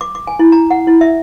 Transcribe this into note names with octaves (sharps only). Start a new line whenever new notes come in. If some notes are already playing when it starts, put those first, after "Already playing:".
D6
D6
G#5
E4
A#5
F#5
E4
E5